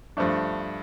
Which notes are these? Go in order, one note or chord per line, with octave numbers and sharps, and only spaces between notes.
G2 F3 A3 D4